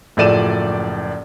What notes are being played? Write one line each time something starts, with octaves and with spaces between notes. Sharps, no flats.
F#1 A2 F3 D5 D#7 E7